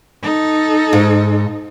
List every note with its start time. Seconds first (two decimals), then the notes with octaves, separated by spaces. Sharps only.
0.23 D#4 A4
0.93 G#2